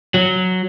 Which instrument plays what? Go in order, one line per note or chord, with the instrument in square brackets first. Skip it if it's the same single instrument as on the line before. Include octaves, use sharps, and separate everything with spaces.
[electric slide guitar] F#3